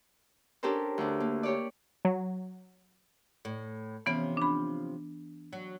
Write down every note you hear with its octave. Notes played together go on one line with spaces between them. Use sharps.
C#4 D4 G4 A4 A#4 C5
D2 D4
A#3
G4 C#5 D5
F#3
A2
C3 E3 F3 B3 C#4
D4 B5
F#3